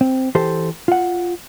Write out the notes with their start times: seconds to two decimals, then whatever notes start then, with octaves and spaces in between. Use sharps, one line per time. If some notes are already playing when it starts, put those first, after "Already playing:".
0.01 C4
0.35 E3 G4 A4 C5
0.88 F4 F#5